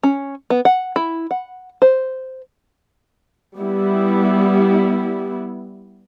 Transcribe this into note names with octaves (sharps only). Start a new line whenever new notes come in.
C#4
B3
F#5
E4
F#5
C5
G3 B3 E4